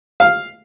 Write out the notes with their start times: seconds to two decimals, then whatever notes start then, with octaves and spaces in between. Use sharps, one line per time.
0.20 F5